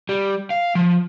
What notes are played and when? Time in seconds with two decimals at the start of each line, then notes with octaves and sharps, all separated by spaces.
0.09 G3
0.50 F5
0.75 F3